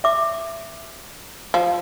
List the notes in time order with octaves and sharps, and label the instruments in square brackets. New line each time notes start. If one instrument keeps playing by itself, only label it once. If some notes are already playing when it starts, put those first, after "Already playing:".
[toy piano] E5 D6
[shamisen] F3